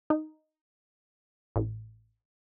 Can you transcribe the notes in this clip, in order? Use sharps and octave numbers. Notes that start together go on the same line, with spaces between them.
D#4
A1